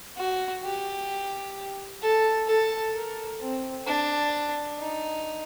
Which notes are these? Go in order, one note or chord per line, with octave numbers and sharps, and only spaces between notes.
F#4
G4
A4
A4
A#4
C4
D4
D#4